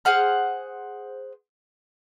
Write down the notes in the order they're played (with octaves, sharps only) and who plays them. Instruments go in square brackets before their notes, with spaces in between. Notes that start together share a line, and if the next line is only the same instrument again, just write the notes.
[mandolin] G#4 C5 F#5 F6